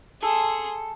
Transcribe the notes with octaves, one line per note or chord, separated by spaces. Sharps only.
G#4 A4 C6